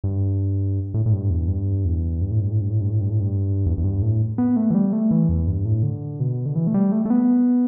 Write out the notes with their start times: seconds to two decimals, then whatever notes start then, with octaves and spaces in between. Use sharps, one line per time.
0.04 G2
0.94 A2
1.06 A2
1.12 G2
1.30 E2
1.48 G2
1.85 E2
2.21 G2
2.31 A2
2.41 G2
2.51 A2
2.61 G2
2.70 A2
2.81 G2
2.90 A2
3.00 G2
3.10 A2
3.20 G2
3.66 E2
3.78 E2
3.84 G2
4.02 A2
4.38 B3
4.56 A3
4.71 E3
4.75 G3
4.93 A3
5.11 E3
5.29 E2
5.47 G2
5.65 A2
5.83 D3
6.20 B2
6.46 D3
6.56 E3
6.67 A3
6.74 G3
6.92 A3
7.05 A3
7.10 B3